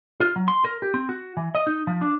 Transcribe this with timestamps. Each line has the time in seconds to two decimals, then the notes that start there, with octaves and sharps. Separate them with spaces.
0.20 F4
0.36 F#3
0.48 C6
0.65 A#4
0.82 G4
0.94 C4
1.09 F#4
1.37 E3
1.55 D#5
1.67 D#4
1.87 F3
2.01 D4